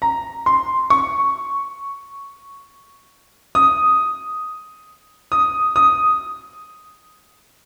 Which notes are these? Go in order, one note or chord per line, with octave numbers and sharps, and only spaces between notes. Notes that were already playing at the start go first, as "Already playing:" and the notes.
A#5
C6
C#6
D#6
D#6
D#6